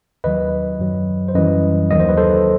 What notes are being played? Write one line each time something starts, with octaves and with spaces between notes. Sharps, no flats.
D#2 D#3 F#3 B4 D#5
F#2 F#3
C5
F#2 E3 G3 B4 D#5
D#2 D#3 F#3 D#5
C5
B4
A4 C5